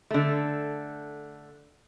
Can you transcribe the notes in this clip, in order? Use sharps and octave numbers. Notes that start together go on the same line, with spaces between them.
D3 A3